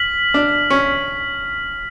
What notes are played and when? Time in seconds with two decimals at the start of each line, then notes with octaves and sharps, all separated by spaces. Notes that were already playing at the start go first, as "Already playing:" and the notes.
Already playing: F6 B6 F#7
0.34 D4
0.70 C#4